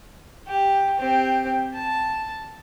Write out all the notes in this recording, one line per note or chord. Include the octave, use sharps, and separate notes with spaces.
G4
C4 G4
A5